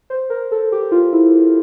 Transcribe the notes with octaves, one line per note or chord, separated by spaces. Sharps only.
C5
A#4
A4
G4
F4
E4